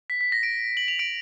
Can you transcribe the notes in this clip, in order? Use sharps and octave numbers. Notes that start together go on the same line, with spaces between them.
B6
B6
A#6
D7
F#7
F7
D7